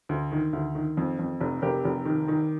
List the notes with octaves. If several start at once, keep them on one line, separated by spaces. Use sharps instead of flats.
D2
D#3
D2
D#3
F2
F2
F1
F1 G4 A#4
F1
D#3
D#3